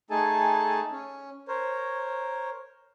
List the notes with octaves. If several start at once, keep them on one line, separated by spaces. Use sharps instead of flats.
A3 D#4 G#4 A4 G#5 A5
C#4
A#4 C5 C#5